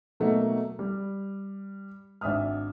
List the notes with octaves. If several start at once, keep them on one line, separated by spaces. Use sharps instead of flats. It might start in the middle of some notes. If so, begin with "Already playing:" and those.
B2 F#3 A3 A#3 D#4
G3
G#1 D4 E5 D#6 F6